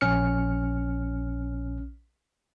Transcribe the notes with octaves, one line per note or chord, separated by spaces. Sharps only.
A#1 C#4 F6 C#7